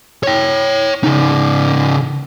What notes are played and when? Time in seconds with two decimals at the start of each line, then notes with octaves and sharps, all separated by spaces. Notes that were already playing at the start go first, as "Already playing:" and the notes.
0.23 C#5 G5
1.04 C#3 D#4